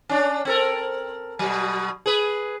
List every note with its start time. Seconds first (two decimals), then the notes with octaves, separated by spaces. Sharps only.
0.09 C#4 D4
0.45 C4 A4 A#4
1.39 B2 F#3
2.06 G#4 B4